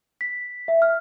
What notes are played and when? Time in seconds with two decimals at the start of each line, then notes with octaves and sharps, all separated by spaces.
0.21 B6
0.68 E5
0.82 F6